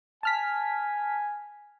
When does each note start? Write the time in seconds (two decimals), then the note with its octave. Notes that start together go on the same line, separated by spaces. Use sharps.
0.23 G#5 A5 F6 B6